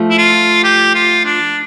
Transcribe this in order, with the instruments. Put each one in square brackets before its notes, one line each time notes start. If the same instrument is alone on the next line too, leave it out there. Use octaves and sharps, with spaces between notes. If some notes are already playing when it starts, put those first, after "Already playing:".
Already playing: [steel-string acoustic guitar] F3 A3
[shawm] E4
F4
G4
F4
D4